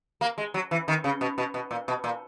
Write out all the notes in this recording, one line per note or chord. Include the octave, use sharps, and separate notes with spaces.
A#3
G#3
F#3
E3
D#3
C#3
B2
B2
B2
A#2
B2
A#2